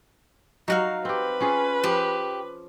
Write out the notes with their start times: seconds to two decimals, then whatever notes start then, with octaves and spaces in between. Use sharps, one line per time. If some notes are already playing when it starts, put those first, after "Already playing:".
0.68 F#3 D#4 F#4 F5
1.05 C4 G4 B4
1.41 C#4 F4 G#4
1.84 F3 G4